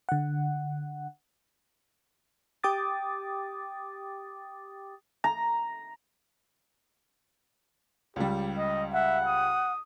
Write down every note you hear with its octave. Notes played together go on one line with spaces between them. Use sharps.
D3 F#5
G4 G5 D6 D#6 A6
A#5
C#2 G3 G4
D#5
E5 F#5
D#6